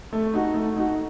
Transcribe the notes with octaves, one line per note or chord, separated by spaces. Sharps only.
A3
D#4 F#4
A3
D#4 F#4